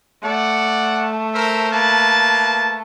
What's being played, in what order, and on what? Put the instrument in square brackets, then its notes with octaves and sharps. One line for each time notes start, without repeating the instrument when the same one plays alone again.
[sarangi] A3 [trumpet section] D5 F#5
[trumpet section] A#4 C5 E5
A#3 B4 A5